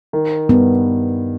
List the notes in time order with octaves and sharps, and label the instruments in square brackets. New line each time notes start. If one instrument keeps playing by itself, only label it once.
[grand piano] D#3
[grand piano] G2 [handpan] B3